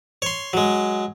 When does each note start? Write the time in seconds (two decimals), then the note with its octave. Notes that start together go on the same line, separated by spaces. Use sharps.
0.22 C#5 C6
0.53 F#3 G#3